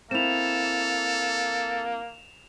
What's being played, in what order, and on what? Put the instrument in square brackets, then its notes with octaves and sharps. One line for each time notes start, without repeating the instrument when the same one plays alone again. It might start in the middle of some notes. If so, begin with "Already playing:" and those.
[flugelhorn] A#3 [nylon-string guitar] C4 E4 [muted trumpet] A4 [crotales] E7 F7